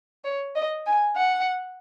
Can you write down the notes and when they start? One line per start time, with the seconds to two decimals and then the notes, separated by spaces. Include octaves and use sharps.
0.24 C#5
0.56 D#5
0.86 G#5
1.17 F#5